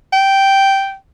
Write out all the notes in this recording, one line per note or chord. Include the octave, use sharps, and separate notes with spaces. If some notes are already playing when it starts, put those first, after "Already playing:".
G5